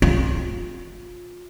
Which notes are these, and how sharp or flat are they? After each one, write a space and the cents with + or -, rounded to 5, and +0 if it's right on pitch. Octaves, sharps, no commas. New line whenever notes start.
F4 +25